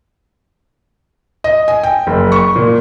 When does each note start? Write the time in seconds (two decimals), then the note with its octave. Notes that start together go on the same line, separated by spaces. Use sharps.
1.44 D#5
1.68 G#5
1.83 G5
2.07 F#1
2.32 C#6
2.56 A#2